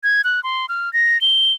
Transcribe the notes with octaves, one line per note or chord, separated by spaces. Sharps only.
G#6
F#6
C6
F6
A#6
G7